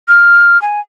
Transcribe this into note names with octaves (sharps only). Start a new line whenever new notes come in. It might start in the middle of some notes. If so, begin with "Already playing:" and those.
F6
G#5